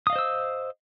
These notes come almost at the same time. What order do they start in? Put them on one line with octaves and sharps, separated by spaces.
D#6 F5 D#5 C5 E6